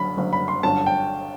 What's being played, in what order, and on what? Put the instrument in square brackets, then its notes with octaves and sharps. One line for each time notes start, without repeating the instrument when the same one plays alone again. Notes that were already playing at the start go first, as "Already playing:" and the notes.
Already playing: [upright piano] F#1 F#2 D3 B5
F#1 F#2 D3
B5
C6
G1 F#2 D3 A5
G5